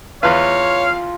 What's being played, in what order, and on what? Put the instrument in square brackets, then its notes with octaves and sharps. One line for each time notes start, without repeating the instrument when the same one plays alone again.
[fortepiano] E2 B4 [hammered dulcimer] F4 [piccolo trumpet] C#5 [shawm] F5